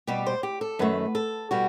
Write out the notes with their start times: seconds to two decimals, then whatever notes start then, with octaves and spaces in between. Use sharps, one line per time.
0.07 B2 G3 G4
0.26 C5
0.43 G4
0.61 A4
0.79 F#2 D#3 A3 B4
1.15 A4
1.51 B2 G3 F#4